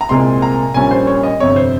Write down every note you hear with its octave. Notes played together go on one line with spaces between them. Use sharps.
A#5
C2 A#2 G#3 C4 C6
A#5
A#1 A#2 G3 C#4 G#5
C5
C#5
D#5
G1 F2 C3 C#5
C5